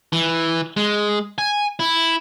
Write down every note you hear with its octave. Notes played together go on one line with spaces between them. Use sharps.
E3
G#3
G#5
E4